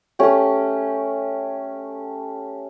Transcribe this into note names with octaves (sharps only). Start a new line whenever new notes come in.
A3 C#4 G4